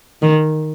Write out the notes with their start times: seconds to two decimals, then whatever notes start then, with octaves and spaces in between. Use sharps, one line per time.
0.22 D#3